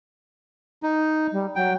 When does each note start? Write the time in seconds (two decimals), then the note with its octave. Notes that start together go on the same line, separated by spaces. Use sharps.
0.83 D#4
1.32 G3
1.56 F#3 G5